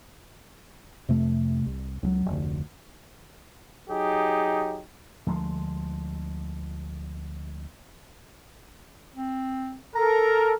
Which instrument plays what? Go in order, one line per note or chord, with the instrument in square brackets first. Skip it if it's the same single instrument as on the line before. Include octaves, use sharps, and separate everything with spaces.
[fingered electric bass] F2 C3 A3
C2
C#2 F3 F#3
F1 D2
[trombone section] F#3 D#4 G4 G#4
[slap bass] D2 F3 G#3
[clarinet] C4
[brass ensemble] A4 A#4 [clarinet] A#5